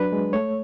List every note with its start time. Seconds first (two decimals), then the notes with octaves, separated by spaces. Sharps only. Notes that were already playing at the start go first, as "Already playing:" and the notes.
Already playing: F#3 D4 B4
0.12 G#3
0.33 A3 C#5